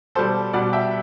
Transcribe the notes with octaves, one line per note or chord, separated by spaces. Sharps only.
B2 G3 A4 C5
B2 G3 D5 F#5
E5 G5